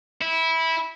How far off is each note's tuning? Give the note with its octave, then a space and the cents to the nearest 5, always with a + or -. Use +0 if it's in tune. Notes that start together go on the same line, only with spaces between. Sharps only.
E4 -15